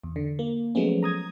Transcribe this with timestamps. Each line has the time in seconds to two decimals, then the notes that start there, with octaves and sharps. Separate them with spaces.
0.04 E2
0.16 D3
0.39 A#3
0.75 F3 F#3 G#3 A3 B3 C#4
1.03 A#5 D#6 G#6